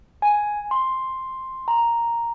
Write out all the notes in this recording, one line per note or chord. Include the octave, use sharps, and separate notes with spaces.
G#5
C6
A#5